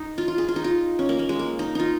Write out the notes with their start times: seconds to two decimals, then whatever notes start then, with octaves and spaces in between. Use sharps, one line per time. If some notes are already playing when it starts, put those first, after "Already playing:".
Already playing: D#4
0.18 F4
0.28 F4
0.38 G#4
0.48 F4
0.56 D#4
0.64 F4
0.99 C#4
1.09 A#3
1.19 A#3
1.29 G#3
1.39 A#3
1.59 D#4
1.75 D#4 F4